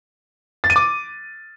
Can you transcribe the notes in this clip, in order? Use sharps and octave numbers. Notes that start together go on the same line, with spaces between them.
A6
D#7
D6